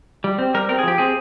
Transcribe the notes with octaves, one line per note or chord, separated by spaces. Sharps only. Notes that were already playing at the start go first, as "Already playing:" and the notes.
G3
C4
G3 A#4
C4 A#4
G#4
F3 G4
C4 G#4